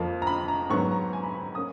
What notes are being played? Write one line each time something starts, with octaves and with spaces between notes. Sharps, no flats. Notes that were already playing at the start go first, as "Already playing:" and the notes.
Already playing: F2 F3 A#3
A#5
B5
A#5
G#2 F#3 B3 C#6
A#5
G#5
B5
B5
A#3 C#4 D#6